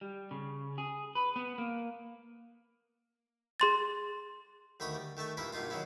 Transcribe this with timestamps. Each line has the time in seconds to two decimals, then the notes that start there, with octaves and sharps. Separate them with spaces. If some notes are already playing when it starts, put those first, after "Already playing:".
0.01 G3
0.31 C#3
0.78 G#4
1.15 B4
1.36 B3
1.58 A#3
3.60 G#4 C6 A6
4.80 D2 D#3 B5 C#6 D#6
4.95 G3
5.17 D#3 A3 A5 C#6
5.37 G2 A#2 E4 A#4 B4
5.52 G2 B2 A#3 D#4 F4
5.70 D#3 F#3 G#3 B3 E4